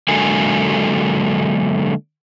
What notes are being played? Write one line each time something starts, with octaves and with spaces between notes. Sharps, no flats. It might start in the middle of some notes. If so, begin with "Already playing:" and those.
D3 F#3 G#3 A#3 A4 G#5